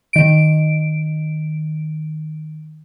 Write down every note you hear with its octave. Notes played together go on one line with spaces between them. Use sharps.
D#3 D7